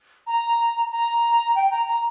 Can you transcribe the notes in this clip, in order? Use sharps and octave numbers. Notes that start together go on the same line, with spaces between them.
A#5
A#5
G5
A#5
A#5